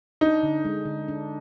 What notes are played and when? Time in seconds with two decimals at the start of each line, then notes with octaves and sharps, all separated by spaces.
0.21 D4 D#4
0.43 D3
0.65 G#3
0.85 D3
1.08 D4